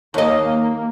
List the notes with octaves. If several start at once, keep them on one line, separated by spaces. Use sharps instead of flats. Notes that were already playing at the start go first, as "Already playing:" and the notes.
D#2 A#3 D#5